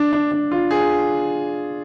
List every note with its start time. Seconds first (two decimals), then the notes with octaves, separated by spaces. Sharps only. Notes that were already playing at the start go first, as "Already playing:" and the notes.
Already playing: D4
0.13 D4
0.32 D4
0.51 F4
0.71 G#4